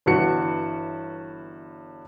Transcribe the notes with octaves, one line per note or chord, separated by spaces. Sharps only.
G1 G2 E3 F#4 C#7